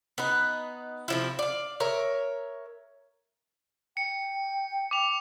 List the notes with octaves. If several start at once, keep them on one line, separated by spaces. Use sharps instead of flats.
B3 D#4 B4
C3 F3 E4
D5 F5
A#4 C#5 E5
G5 C#7
D6 F7